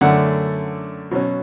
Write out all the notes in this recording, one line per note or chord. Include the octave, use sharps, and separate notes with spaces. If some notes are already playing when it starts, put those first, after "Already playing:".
F#2 D3 A3 D5 F#5
B2 F#3 C#4